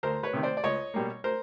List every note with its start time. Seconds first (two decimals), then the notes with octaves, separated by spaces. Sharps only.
0.03 D2 A#4 C5
0.23 B4 C#5
0.33 C3 D#3
0.43 C5 D5
0.57 D5
0.63 C#2 C#5 D#5
0.94 B2 G3 A#3
1.24 A#4 C5